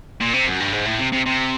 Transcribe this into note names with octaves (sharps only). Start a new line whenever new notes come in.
A#2
C3
F#2
G2
G#2
A2
C3
C3
C3